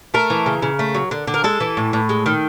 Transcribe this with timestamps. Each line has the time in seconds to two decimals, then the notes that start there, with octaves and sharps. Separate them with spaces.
0.14 A3 A#4
0.30 E3
0.46 C#3
0.62 C#3
0.79 A3
0.95 F#3
1.11 D3
1.27 D3
1.34 A#4
1.44 G#3 A4
1.60 E3
1.77 A2
1.93 A2
2.09 G#3
2.26 D#3